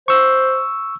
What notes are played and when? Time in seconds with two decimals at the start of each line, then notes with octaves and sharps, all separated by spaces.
0.08 C5 C#6 E6